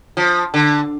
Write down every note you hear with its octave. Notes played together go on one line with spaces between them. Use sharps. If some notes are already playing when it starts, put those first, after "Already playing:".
F3
D3